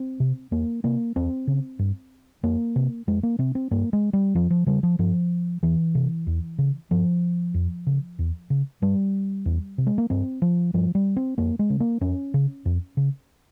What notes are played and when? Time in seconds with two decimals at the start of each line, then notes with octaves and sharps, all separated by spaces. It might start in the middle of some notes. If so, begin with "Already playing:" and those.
Already playing: C4
0.20 C3
0.51 E2 A#3
0.84 C3 A#3
1.16 E2 C4
1.47 C#3
1.79 G2
2.43 F2 A#3
2.76 C3
3.07 F2 G#3
3.23 A#3
3.39 C3 C4
3.55 C4
3.71 G2 A#3
3.93 G#3
4.13 G3
4.35 F2 F3
4.50 F3
4.66 C#3 G3
4.83 F3
4.99 G2 F3
5.63 E2 E3
5.95 C3
6.27 E2
6.58 C#3
6.91 G2 F3
7.54 F2
7.87 C#3
8.19 E2
8.50 C#3
8.82 G2 G3
9.46 E2
9.78 C3
9.87 G#3
9.98 A#3
10.10 G2 C4
10.42 F3
10.74 G2 F3
10.95 G3
11.16 C4
11.38 F2 A#3
11.59 G#3
11.70 C#3
11.80 A#3
12.01 F2 C#4
12.34 C#3
12.65 F2
12.97 C#3